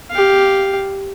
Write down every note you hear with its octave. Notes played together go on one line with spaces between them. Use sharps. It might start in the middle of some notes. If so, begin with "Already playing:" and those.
G4 F5